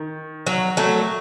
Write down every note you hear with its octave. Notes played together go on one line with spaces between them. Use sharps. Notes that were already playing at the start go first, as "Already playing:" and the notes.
Already playing: D#3
F#3
F#3 A3